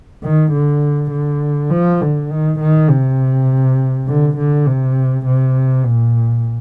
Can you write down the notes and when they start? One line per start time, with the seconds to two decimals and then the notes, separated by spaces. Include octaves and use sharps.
0.23 D#3
0.52 D3
1.11 D3
1.71 F3
2.01 D3
2.31 D#3
2.60 D#3
2.89 C3
4.07 D3
4.37 D3
4.66 C3
5.26 C3
5.85 A#2